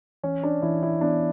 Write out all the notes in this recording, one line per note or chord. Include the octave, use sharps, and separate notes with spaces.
E3 C#4
D4
E3 E4
E4
B3 D4